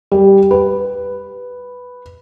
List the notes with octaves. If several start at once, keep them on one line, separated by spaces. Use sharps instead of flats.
G3
B4